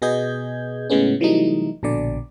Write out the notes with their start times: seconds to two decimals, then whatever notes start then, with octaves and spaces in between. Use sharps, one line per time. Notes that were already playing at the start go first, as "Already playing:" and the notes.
0.02 B2 B3 G#4 D#5 G6 G#6
0.90 A2 C#3 G#3 B3 C#4
1.20 C3 E3 F#3 G3 A3 D#4
1.83 A#1 B2 D3 D5